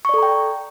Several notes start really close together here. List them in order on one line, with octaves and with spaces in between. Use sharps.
C#6 D5 A4 A#5 G5